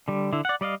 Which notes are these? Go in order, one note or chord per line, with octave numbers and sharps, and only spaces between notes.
D3 G3
D3 E4
D5 F#5
G3 D5 D#5 F5